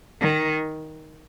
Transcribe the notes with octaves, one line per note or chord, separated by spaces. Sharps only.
D#3